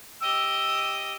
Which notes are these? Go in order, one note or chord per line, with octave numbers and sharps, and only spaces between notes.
G4 D#5 E6